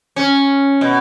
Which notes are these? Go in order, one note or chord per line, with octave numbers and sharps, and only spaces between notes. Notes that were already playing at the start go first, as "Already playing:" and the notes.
C#4
B2